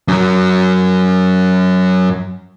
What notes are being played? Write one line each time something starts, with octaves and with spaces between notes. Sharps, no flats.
F#2 F#3